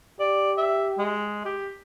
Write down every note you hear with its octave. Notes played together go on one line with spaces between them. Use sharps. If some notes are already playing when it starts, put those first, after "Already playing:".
G4 D5
E5
G#3
G4